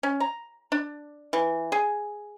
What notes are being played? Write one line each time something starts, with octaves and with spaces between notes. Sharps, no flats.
C#4
A#5
D4
E3
G#4